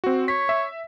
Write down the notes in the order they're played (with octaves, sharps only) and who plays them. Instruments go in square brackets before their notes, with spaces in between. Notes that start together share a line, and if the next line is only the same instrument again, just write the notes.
[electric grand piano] C4 F#4
[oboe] C#5 [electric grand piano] B6
[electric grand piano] E5